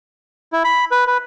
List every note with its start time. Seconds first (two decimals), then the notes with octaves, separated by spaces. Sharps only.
0.53 E4
0.65 B5
0.91 B4
1.07 B4